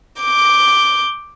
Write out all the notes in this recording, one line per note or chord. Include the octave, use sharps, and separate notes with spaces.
D6 G6